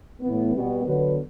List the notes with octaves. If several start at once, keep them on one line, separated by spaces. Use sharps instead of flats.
A2 E3 B3
B2 G3 B3
D3 F#3 B3 F#4 B4